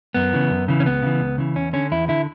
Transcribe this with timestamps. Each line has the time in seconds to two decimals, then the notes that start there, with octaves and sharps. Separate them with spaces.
0.14 F#2 B3
0.33 C#3 E3
0.50 F#2
0.68 C#3 E3
0.80 C#4
0.86 C#2 B3
1.03 C#3 E3
1.21 C#2
1.38 C#3 E3
1.56 E2 C#4
1.73 D3 C#4
1.92 E2 E4
2.08 D3 E4